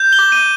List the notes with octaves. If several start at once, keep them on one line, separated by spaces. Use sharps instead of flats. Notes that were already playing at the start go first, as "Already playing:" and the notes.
Already playing: G6
G7
D6
D#7